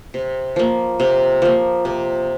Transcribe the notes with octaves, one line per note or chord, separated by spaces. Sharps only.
C3
F3 A#3
C3
F3 A#3
C3